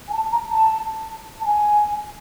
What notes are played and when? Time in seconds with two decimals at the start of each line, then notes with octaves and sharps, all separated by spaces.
0.08 G#5
0.13 A5
0.32 A#5
0.51 A5
1.41 A5
1.46 G#5